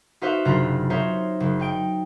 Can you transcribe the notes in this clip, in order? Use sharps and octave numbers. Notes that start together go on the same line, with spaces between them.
D#4 F#4 B4 C5 E5 F5
F#1 C3 D4 F4 A#5 B5
D#4 F4 C5 C#5 E5 A#5
F#1
D#4 G5 D7